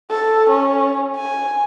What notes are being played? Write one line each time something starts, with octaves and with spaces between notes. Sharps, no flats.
A4
C#4
G#5